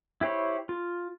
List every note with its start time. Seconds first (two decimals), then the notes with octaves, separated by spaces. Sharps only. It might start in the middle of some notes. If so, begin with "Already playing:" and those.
0.21 E4 G4 C5 C#5 B5
0.69 F4